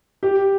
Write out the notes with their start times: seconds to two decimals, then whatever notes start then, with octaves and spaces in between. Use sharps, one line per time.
0.23 G4